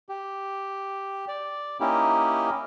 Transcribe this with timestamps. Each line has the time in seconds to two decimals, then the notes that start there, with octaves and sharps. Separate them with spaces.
0.09 G4
1.28 D5
1.80 A#3 C#4 D#4 E4 G4